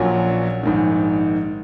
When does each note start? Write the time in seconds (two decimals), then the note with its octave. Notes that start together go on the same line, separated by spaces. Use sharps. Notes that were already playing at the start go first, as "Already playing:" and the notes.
Already playing: A#1 A#2 F#3 C#4 F#4
0.63 A#1 G#2 D#3